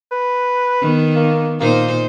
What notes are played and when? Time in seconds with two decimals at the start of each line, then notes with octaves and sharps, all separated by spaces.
0.11 B4
0.81 D#3 B3
1.16 A#3
1.60 A#2 A#3 D#4 C5